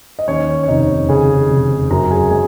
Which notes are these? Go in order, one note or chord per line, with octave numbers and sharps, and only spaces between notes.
D#5
D#2 C#4 C#5
C#5
F1 D#4 D#5
C#3 G#4 G#5
F1
F#2 A#4 A#5
G#4 G#5
G#3 G#4 G#5